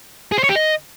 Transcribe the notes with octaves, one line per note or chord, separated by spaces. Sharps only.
G#4
C5
C#5
G4
D#5